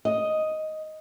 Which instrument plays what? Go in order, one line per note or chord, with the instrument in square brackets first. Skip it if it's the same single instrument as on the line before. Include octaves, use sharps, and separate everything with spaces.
[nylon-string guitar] D#5